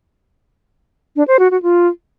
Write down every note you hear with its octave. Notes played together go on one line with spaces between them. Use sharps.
D4
C5
F#4
F#4
F4